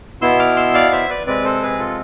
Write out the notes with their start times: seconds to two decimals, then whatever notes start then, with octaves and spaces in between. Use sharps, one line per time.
0.21 B2 B3 E4 C6 E6
0.39 D6 F6
0.57 C6 E6
0.74 D5 F5
0.92 C5 E5
1.09 B4 D5
1.27 C3 G#3 C4 B4 D5
1.44 A4 C5
1.62 G#4 B4
1.79 F4 A4